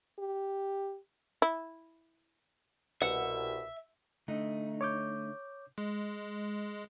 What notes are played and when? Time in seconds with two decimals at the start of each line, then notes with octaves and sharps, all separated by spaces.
0.19 G4
1.42 E4
3.02 C2 B2 E5 F#5
4.28 D3 A3 D#4
4.81 C#5 D6 G6
5.78 G#3